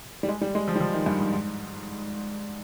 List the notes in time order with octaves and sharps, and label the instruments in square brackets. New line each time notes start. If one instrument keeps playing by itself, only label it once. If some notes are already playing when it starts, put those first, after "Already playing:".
[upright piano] G3
G#3
G3
G#3
F3
G3
F3
D#3
G2
G#2
G#2